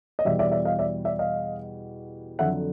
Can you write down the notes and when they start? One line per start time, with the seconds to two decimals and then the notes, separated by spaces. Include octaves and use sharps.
0.19 D#5
0.25 E2 B2 G3 D5 E5
0.39 D5 E5
0.51 D5 E5
0.65 D#5 F5
0.79 D5 E5
1.05 D5 E5
1.19 D#5 F5
2.39 F2 D3 F#3 E5 F#5